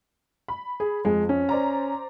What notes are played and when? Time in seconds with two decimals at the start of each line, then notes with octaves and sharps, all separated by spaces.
0.48 B5
0.80 G#4
1.05 F2 G#3
1.29 C#4
1.49 C5 D5 A#5